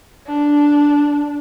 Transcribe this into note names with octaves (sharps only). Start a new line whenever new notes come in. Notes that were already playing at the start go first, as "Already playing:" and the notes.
D4